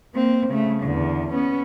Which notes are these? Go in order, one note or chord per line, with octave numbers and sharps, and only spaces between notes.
A#3 C4
C#3 A3
E2 D3
B3 C#4